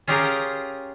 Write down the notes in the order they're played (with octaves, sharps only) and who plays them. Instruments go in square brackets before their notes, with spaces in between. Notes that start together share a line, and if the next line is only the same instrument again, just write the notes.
[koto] C#4 F4 G4 G#4 A#4